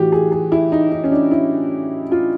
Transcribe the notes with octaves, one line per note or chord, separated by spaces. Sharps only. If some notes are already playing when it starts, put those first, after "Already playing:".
Already playing: A2 E3 F#4 G4
G#4
G#4
E4
D#4
D#4
C#4
D4
E4
F4